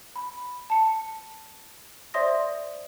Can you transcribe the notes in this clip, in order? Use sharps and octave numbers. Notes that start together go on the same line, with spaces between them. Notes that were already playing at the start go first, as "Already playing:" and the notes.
B5
A5 C#7
C5 D5 E5 C6 D#6 A#6